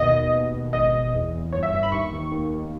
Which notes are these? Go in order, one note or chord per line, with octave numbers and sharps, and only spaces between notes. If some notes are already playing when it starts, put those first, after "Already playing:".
Already playing: D#2 B2 D#5
D#2
B2
B2
G#1 D#5
G#1
E2
E2
G1 C#5
E5
G2 E5
B5
D#2 C#6
D#3
D#2
D#2